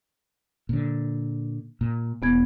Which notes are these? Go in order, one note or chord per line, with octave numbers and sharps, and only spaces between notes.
A#2 D3
A#2
E1 E2 B3 G#6